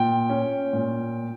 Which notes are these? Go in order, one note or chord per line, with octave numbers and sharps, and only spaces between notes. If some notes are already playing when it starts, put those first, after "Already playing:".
Already playing: A#2 G5
C#4
A#2